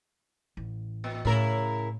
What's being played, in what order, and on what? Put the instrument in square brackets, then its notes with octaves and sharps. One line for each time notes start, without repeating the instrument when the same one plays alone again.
[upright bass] A1
[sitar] A#2
[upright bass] A2 [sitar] C#3 E4 A#4